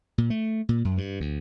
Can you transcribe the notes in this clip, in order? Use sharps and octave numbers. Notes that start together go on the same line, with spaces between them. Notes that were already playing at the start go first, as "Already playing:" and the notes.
A#2
A3
A#2
F#2
G2
D2